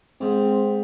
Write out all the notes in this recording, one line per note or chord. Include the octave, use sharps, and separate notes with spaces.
G#2 C4